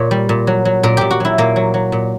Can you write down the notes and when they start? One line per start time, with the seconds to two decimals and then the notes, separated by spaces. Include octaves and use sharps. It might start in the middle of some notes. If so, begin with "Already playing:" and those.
Already playing: A#2 C#5
0.11 G3
0.29 A#2
0.47 F#3
0.65 F#3
0.83 A#2 A#4
0.97 A#2 G4
1.11 F#4
1.20 F#3 E4
1.38 A#2 A#3
1.56 F#3
1.74 F#3
1.92 A#2